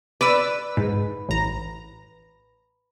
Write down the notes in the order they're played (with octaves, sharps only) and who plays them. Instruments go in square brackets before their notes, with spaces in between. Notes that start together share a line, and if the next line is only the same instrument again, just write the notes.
[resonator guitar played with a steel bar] B4 [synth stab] D5 D6 E6
[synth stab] G#2
A1 A#5